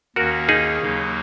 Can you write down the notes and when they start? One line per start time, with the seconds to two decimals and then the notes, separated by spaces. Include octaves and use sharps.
0.16 D#2 D#3 A#3 C#4 F#4 A#4
0.49 D#4 G#4
0.81 D#2 C#3 F#3 A#3